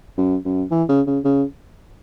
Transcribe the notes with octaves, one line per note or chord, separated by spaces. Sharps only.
F#2
F#2
E3
C#3
C#3
C#3